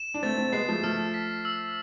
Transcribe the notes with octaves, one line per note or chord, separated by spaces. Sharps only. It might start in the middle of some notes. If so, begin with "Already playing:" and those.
Already playing: E7
D4
A3 C4 A6
A3 C4
G#3 B3 C7
F3 A3
F3 A3 F6
B6
E6